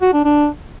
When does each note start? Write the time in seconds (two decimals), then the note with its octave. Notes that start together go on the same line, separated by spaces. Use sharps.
0.02 F#4
0.13 D4
0.25 D4